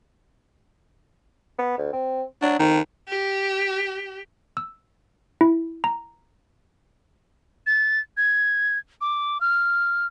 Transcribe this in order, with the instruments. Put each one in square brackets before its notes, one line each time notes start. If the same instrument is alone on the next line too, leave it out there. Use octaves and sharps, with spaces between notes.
[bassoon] B3
D2
C4
[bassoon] F#3 [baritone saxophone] D4
[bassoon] F2 [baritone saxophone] D#3
[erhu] G4
[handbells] E6
E4
A#5
[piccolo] A6
G#6
D6
F6